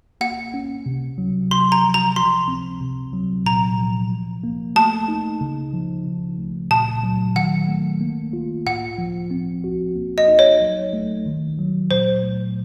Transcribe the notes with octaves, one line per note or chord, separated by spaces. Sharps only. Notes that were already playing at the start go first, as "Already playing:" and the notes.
A#3 F#5
C#4
C3
F#3
C3 C6
A#5
F3
A#5
F3 C6
C4
C3
F#3
A#2 A#5
F3
F3
A#3
A3 A5
D#4
C#3
F3
C#3
A3
A#2 A5
F#3
D#3 F#5
A3
A#3
F4
A2 F#5
F3
C4
F#4
A#3
D#5
D#4
C#5
F#3
A3
D#3
F#3
A#2 C5
A3